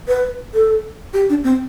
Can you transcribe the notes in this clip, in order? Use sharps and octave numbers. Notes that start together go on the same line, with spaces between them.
B4
A4
G4
D4
C4